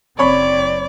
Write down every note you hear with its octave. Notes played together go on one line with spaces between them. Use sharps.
F#1 C4 C#5 D5 B5 C#6